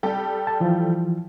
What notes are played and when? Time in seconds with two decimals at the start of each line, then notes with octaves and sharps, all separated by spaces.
0.03 G3 G4 A4
0.47 A5
0.60 E3 F3